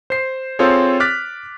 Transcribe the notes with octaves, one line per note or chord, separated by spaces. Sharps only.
C5 C7
C4 F4 G#4 A4 C5 C#5
D6 F6 F#6 A6 B6